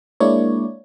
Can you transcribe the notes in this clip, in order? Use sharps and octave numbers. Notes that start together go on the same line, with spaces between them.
G#3 A#3 D4 E4 C#5 D5